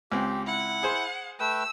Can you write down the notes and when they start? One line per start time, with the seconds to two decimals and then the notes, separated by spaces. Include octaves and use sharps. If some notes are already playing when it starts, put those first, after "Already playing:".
0.12 C#2 C4 G4
0.46 E4 F#5
0.83 G#4 C5
1.40 A3 B4 G5 E6